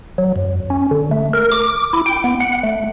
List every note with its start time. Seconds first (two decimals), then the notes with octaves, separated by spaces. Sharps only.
0.18 F#3
0.36 F#2
0.70 C#4
0.91 D3
1.11 A3
1.33 A#4
1.52 D6
1.93 E4
2.06 G5
2.24 B3
2.40 F#5
2.63 A3